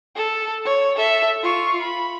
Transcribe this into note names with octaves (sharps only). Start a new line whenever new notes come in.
A4
C#5
A4 E5
F4 C#6
B5